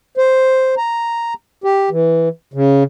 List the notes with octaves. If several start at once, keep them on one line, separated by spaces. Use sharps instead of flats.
C5
A#5
G4
E3
C#3